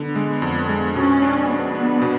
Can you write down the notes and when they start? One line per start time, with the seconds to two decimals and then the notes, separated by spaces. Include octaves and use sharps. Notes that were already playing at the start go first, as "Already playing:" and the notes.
Already playing: D3 B3
0.16 G#3
0.42 F2
0.69 G#3
0.95 B2 C#4
1.22 D4
1.48 B3 D4
1.75 D4
2.02 B2